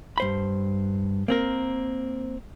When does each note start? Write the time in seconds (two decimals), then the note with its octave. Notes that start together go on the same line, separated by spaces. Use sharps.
0.18 G2 C5 B5
1.28 A#3 C4 A#4